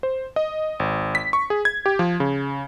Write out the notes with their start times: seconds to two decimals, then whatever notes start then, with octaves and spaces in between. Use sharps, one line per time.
0.03 C5
0.36 D#5
0.80 G#1
1.15 B6
1.33 C#6
1.50 G#4
1.65 G#6
1.86 G4
1.99 F3
2.20 C#3